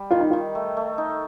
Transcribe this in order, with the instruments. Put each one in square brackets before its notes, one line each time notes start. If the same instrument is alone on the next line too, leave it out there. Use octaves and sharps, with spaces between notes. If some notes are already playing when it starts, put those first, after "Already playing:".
Already playing: [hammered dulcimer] G3
[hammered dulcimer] D#3 [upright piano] F4
[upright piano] D#4
F4
[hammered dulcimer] D#3
A3
A3
D#4